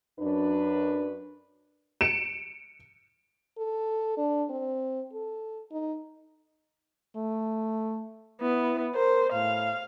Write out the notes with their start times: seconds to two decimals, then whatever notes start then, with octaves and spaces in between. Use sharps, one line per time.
0.20 F#2 D4 B4
2.01 C#7 D7 E7
3.57 A4
4.17 D4
4.50 C4
5.13 A4
5.71 D#4
7.16 A3
8.42 B3 E4
8.95 A#4 C5
9.33 A2 F5